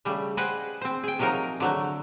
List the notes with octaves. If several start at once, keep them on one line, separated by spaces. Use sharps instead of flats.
C#3 G3 A3
G#4 B4 C5 D#5 F#5 G5
C4 C5
G#4 G5
C3 F3 F#3 D#4 A#4
D3 F#3 A3